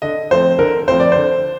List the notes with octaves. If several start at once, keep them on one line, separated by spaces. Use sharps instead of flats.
D3 D#5
F3 A3 C4 C5
D3 A#4
F3 A3 C4 C5
D5
D3 C5